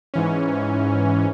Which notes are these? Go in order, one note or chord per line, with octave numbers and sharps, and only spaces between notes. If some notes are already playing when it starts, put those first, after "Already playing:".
G#2 E3 C#4